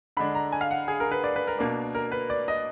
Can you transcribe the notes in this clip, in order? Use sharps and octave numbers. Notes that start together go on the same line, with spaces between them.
D3 G#3 D4 B5
A#5
G#5
F5
F#5
G#4
A#4
B4
D5
B4
A#4
B2 A#3 D4
A#4
B4
D5
D#5